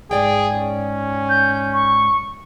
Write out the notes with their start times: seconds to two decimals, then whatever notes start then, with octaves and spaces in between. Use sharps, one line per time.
0.11 G#2 G#4 D5 G5
0.55 C#4
1.29 G6
1.74 C#6